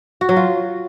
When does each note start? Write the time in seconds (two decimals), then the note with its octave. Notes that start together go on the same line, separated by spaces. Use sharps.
0.21 F#4
0.29 F#3
0.36 F4